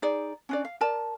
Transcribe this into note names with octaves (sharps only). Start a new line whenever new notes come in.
D#4 G#4 D5
C#4 D4 D5
F5
A#4 D5 A5